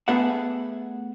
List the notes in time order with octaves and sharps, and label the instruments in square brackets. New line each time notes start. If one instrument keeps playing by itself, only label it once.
[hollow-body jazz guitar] A3 B3 G#4 E5 F#5